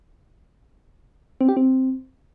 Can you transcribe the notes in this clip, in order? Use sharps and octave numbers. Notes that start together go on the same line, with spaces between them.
C4
G4
C4